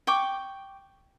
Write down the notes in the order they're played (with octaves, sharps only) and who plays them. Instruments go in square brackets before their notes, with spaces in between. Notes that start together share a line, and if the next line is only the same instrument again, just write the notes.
[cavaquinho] G5 C#6 D6